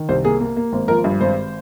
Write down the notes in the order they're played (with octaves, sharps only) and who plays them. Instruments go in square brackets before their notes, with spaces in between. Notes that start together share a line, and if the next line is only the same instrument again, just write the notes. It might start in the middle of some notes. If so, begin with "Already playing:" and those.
Already playing: [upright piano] D#3
C2 C5
A#3 G#4
A#3
A#3
G#1
F3 A#4
G2
G#1 C5